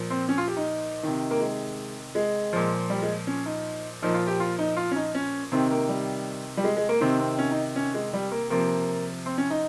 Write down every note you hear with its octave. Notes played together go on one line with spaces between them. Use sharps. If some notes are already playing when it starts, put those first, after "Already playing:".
Already playing: A#2 F3
C4
C#4
F4
G4
D#4
C3 D#3
A#3
G#3
G#3
A#2 F3
G3
G#3
C#4
D#4
A#2 F3 D#4
F4
G4
F4
D#4
F4
C#4
D#4
C#4
C3 D#3 C4
A#3
G3
G3
G#3
G#3
A#3
C3 D#3 C4
C4
C#4
D#4
C#4
G#3
G3
A#3
C3 F3 A#3
C4
C#4
D#4